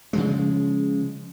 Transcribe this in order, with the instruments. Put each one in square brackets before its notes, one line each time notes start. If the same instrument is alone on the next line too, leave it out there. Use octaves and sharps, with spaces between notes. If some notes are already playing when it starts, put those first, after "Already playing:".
[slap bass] C#3 F3 G#3